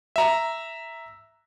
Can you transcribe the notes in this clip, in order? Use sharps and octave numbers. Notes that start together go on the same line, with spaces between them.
E5 A#5